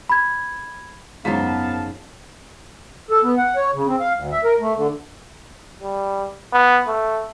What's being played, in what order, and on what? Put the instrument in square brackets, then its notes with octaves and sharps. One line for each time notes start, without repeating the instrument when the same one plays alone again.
[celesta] B5 G#6
[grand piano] F#1 B6 [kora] G#2 F3 F#3 [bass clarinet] B3 [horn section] F5 A5
[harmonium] A4
B3
F#5
C#5
C#3
C4
F5
D2
E5
A#4
A3
D3
[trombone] G3
B3
A3